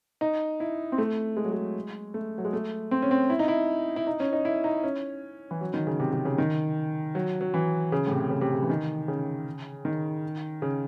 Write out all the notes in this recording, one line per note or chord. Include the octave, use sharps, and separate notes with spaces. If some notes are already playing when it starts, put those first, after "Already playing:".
D#4
E4
C4
A3
G#3
F#3
G#3
A3
F#3
G#3
A3
C4
C#4
C4
E4
D#4
E4
E4
D#4
C#4
D#4
E4
D#4
C#4
E3
F#3
D#3
C#3
C3
C3
C#3
D#3
F#3
F#3
E3
C#3
A2
C3
C#3
C3
C#3
E3
D#3
C#3
D#3
C#3